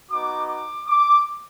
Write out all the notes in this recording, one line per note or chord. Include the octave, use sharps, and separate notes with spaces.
B3 D#4 F#4 D6
D6
D6